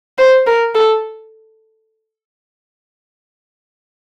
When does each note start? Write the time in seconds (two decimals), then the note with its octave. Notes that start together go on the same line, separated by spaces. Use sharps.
0.18 C5
0.47 A#4
0.75 A4